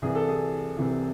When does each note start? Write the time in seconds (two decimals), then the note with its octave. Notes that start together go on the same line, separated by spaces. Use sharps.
0.02 C2 C3 E3 G#4
0.15 A4
0.29 G#4
0.77 C2 C3 E3